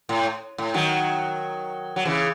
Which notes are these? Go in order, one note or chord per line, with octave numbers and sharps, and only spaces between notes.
A2
A2
D#3 F#3
F#3
C#3 E3